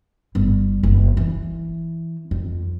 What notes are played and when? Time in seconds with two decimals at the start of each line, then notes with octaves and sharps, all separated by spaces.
0.35 G1 G3
0.83 F#1
1.17 E3
2.31 F2